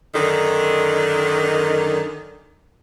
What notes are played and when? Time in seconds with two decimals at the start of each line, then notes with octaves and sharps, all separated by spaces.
0.14 F#2 D3 D#3